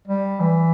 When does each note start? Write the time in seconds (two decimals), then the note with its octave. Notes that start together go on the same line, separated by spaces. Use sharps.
0.08 G3
0.40 E3